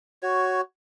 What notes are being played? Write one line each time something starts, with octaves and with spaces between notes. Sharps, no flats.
F#4 C#5